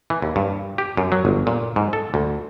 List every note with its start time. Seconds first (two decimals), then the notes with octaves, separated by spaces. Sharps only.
0.10 E3
0.22 D#2
0.36 G2
0.78 G4
0.97 F#2
1.12 F#3
1.25 G1
1.47 A#2
1.76 G#2
1.93 A4
2.14 D2